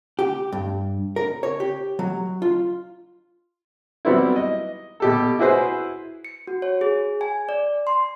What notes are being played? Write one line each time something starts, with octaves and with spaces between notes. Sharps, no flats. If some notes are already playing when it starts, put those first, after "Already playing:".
G4
G2
A#4
C#5
G4
F#3
F4
F#3 G3 B3 C4 E4
D#5
B2 G4 A4
E4 F#4 G#4 B4 C5
C#7
F#4
C#5
G#4
G#5
D5
C6